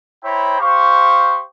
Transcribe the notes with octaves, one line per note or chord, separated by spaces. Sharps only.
E4 C5 C#5 G5 A#5 B5
G4 C5 F5 C#6